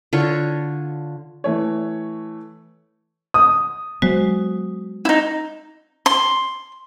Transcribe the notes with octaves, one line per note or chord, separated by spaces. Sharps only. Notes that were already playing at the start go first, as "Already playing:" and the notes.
D3 F4 C#5
E3 A3 C#5
D#6
F#3 G#3 B3 F#4 C5
D#4 E4
C6